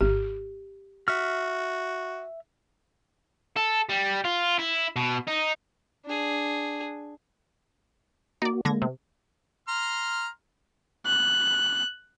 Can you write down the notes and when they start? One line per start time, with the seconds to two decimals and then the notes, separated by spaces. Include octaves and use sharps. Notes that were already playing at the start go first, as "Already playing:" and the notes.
0.01 G#1 G4
1.08 F#4 E5 F6
3.57 A4
3.89 G3
4.24 F4
4.59 E4
4.96 B2
5.28 D#4
6.05 D4 G#4
8.42 A#3 D#4 F#4 D5
8.65 D3 G#3 A#3 G#6 A#6
8.82 C3
9.68 A#5 C6 F6
11.06 F#6